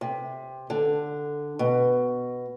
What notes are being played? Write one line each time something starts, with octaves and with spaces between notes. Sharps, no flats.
C3
D3
B2